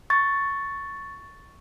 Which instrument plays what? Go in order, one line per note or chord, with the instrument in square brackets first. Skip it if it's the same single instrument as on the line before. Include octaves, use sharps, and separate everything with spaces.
[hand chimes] C#6 A6